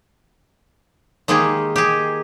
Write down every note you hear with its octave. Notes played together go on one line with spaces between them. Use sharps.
D#3 G#3 A#3 G4 G#4
G4 G#4